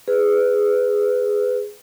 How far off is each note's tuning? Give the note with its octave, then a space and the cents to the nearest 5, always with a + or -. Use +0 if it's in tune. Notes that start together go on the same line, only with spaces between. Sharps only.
G#4 +0 B4 +20